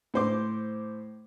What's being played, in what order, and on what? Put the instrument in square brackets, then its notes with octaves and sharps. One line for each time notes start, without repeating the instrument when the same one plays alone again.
[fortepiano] A2 C5 D6